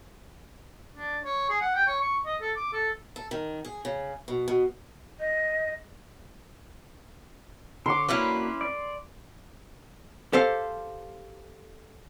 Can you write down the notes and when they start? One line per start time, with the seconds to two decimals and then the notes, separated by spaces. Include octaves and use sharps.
0.95 D4
1.25 C#5
1.49 G#4
1.61 F#5
1.75 G5
1.87 C#5
2.01 C#6
2.26 D#5
2.41 A4
2.56 D6
2.73 A4
3.16 A4
3.31 D#3
3.65 G#4
3.85 C#3
4.28 B2
4.48 B2
5.19 D#5
7.86 D3 C#5 C6 D6
8.09 A#3 C#4 D4 E4 F#4 B4
8.61 D5
10.33 G4 A4 C5 F5